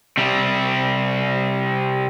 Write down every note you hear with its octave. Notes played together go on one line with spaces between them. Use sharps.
C3 G3